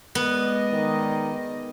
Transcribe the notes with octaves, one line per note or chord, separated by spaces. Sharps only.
G#3 B3 D5 D#5
D#3